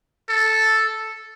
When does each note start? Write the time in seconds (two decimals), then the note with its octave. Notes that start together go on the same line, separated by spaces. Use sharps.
0.29 A4